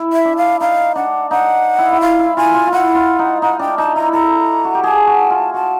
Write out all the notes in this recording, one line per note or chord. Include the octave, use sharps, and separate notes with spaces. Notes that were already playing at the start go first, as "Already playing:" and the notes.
Already playing: E4
E5
D4
F5
D#4 F5
D4 F#5
D#4 F#5
E4
E4
F4 F5
E4
F4 G#5
F4
F4
E4 F#5
F4
D#4
D#4 F#5
D4 G5
D#4 A5
E4 A#5
A4 A#5
F#4
G4
G#4 A5
F#4
F4
F#4 A5